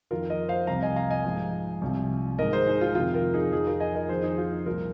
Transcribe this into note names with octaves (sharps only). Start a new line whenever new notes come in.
F2 D#3 F4 A#4
A#4 D#5
C5 F5
C2 C3 F3 F5 A#5
D#5 G#5
F5 A#5
D#5 G#5
G#2 F3
C2 C3 F3
G#2 D#3 A#4 D#5
G#4 C5
D#4 G#4
F4
F2 C3 D#3 F4
F4 A#4
D#4 G#4
F2 F3 D#4 G#4
F4 A#4
D#5 G#5
A#4 D#5
F2 D#3 G#4 C5
D#4 G#4
F4
D#4
C2 A#2 F3 F4 A#4